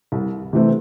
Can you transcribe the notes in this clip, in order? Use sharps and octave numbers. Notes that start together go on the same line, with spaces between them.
C2
C3 E3 A3 C4